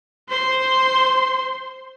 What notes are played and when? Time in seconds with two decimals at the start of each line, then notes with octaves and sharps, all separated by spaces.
0.29 C5 C6